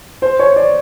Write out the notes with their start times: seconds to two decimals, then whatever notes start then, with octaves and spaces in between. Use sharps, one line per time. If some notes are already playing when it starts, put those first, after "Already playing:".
0.22 C5
0.39 C#5
0.56 D5